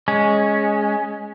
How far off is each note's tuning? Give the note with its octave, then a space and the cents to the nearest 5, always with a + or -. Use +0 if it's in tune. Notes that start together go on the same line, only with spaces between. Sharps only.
G#3 +0 C#4 +0